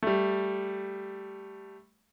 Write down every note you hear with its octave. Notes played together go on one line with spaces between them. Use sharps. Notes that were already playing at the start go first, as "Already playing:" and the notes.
G3 A3